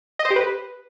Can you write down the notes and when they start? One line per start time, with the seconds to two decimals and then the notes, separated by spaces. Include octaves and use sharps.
0.19 D#5
0.25 C5
0.30 G4
0.36 B4